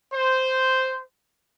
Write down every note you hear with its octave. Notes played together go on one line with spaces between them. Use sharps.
C5